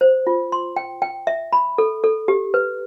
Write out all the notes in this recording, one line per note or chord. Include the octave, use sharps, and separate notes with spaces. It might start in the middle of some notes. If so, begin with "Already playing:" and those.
C5
F4
C6
G5
G5
E5
B5
A4
A4
G4
B4